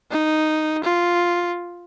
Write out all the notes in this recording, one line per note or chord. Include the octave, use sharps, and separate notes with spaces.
D#4
F4